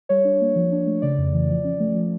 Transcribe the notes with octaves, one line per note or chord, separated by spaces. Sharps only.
G3 C#5
D4
A#3
F3
D4
A3
C#3 D5
F2
E3
F3
C#4
A3
F3